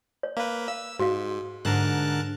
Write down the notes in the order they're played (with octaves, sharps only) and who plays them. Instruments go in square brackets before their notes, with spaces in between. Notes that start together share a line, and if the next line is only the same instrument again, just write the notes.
[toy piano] C#5
[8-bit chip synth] A#3 B4 [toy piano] F5
[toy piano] F5 [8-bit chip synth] E6
[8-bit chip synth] G#2 [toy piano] F#4 F5
[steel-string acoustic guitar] G#2 D3 [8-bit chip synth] A#4 A5 F#6